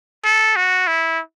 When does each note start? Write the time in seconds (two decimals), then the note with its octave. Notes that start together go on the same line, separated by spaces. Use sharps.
0.25 A4
0.56 F#4
0.87 E4